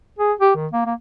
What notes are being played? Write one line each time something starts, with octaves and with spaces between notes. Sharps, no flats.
G#4
G4
D#3
A#3
A#3